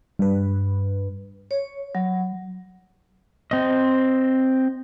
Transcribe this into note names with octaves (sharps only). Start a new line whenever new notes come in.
G2 B4
C#5
F#3
C4 D#5